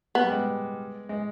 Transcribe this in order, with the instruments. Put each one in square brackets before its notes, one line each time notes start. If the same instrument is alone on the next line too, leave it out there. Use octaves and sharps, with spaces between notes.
[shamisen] B3
[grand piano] G3
G#3
G#3